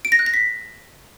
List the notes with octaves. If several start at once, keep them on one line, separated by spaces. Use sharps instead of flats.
D7
A#6
F#6
A#6
B6